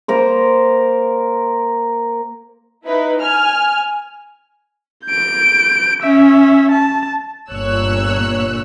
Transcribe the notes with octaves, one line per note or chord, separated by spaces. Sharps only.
A#3 A#4 C5
D#4 E4 B4
G#5 F6
G6 D7
C#4 E5
A5
G1 A#2 C#5 E6 F#6